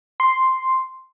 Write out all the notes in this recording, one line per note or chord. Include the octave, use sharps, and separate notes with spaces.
C6